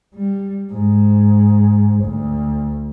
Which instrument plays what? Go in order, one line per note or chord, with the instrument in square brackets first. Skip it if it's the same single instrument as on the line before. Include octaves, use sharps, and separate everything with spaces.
[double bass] G3
G#2
D2